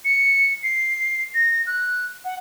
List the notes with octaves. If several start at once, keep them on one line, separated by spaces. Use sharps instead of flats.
C#7
C7
A#6
F#6
F#5